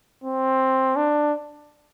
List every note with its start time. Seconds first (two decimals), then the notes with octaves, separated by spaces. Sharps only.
0.24 C4
0.96 D4